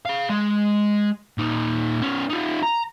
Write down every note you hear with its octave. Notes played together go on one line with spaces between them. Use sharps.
G#4 F5
G#3
A#2 D#4
B3 C#4
D#4 F4
A#5